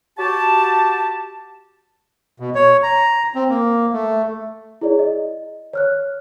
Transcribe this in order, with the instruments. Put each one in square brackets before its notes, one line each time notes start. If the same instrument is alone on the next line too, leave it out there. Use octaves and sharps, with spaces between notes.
[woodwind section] F#4 G4 A5
[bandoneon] B2
C#5
A#5
C4
A#3
A3
[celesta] E4 G#4 C#5 D5
D#5
C#5 F6 F#6